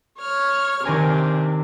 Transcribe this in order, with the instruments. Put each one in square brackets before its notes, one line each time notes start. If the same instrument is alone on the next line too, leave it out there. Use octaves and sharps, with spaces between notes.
[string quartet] C#5 F6
[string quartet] C3 D4 [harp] D#3 A#4 G#5